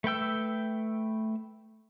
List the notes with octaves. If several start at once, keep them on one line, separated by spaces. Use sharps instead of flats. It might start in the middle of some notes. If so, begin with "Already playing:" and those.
A3 B4 G5 E6